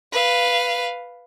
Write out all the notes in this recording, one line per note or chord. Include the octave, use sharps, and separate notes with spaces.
B4 F5